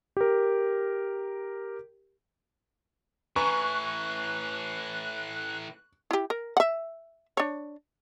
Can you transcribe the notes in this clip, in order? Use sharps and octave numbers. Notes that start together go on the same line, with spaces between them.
G4 A#4
A2 E3 B4 G#5 A#5 C#6 F#6
E4 G4
A#4
E5 F#5
D4 C#5